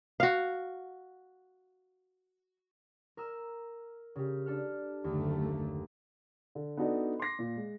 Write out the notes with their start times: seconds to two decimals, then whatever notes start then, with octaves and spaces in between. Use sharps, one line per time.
0.20 F#4 F5
3.17 A#4 E6
4.16 C#3 G4
4.46 D4 A4 F6
5.04 F#1 D#2 D3 A3
6.55 D3
6.77 B3 D4 D#4 F#4 A4 D5
7.20 C6 D6 A#6 C7
7.39 A#2
7.56 G#3